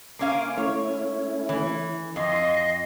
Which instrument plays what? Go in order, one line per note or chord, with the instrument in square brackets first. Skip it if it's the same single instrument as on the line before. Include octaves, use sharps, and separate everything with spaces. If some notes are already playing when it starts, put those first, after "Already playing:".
[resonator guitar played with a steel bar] A#3 C#4 F5 [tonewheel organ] C6 D6
[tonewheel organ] A3 C#4 E4 [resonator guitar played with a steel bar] C#5
[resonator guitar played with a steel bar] E3
[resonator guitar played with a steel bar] F2 [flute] D#5 [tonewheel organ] C6